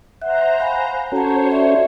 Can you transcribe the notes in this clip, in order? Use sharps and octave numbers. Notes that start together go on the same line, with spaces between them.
C5 E5 F#5 A#5
F5 F#5 G#5 B5
C#4 F#4 A4 C5 C#5 A5 A#5
D5 E5